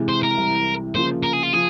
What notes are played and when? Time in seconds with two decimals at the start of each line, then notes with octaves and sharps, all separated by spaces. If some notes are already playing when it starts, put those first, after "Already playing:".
Already playing: C3 E3 G#3
0.09 C5
0.23 A#4
0.37 C2 C3 E3 G3
0.95 C#3 F3 A#3 C5
1.23 A#4
1.33 G#4
1.43 F4
1.53 F3 G#4